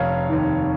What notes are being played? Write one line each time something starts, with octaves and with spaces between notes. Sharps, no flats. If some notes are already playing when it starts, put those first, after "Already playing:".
Already playing: F1 C#5 F5
D#2 D#3